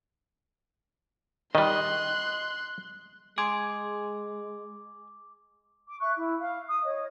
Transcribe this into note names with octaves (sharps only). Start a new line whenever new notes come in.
D#3 G3 D#5 C6 F#6
G#3 G#4 C6 D6 G#6 D7
D6
E5 C#6 F#6
E4
F5
D#6
C#5 D#5